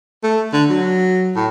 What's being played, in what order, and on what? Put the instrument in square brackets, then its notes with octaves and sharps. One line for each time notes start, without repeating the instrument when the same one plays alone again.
[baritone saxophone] A3
D3
F#3
A2